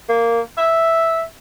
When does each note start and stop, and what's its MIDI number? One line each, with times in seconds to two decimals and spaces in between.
0.09 0.41 58
0.58 1.22 76